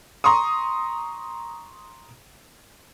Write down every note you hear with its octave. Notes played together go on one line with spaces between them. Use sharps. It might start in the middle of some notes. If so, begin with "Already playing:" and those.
A#5 C6 C#6 D#6